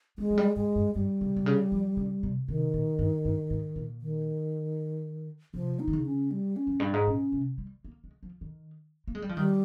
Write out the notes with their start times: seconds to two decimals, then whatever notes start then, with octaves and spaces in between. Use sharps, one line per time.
0.18 G#3 C4
0.30 F3
0.38 G3
0.56 G#2 G#3
0.76 G2
0.95 G2 G3
1.21 C#3
1.36 C3
1.46 C#3
1.72 F3
1.97 C#3
2.23 C3
2.48 C3 D#3
2.74 A#2
2.99 G2
3.25 G2
3.50 G#2
3.76 A#2
4.01 D#3
5.54 C3 F3
5.80 D#4
5.88 D#3
5.93 C#3
6.06 C#4
6.31 G3
6.56 C#4
6.67 F2
6.80 G2
6.93 G#2
7.07 A#2 C#4
7.32 C3
7.58 G3
7.85 A#3
8.04 G#3
8.23 F3
8.41 D#3
9.07 A#3
9.15 G#3
9.22 G3
9.29 F3
9.37 D#3 G3